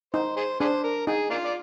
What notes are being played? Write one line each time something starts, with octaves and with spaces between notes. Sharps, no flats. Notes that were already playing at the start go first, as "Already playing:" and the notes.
D#4 C5
G#4 C5
D4 G#4 C5
A#4
D#4 G#4
A#3 D4 F4
D5